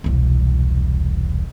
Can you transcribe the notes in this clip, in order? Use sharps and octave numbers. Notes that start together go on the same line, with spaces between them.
E1 C2